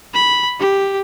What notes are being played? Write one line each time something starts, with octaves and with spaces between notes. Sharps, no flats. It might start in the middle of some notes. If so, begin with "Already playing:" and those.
B5
G4